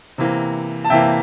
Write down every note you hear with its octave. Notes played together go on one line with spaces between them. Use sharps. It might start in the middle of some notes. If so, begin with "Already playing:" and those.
C3 E3 A#3
A5
C3 E3 A#3 E5 G5